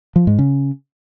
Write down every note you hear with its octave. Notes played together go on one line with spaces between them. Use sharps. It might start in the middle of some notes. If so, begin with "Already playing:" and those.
F3
G#2
C#3